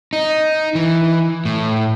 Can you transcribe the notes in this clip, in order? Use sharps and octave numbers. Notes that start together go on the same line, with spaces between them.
D#4
E3
A2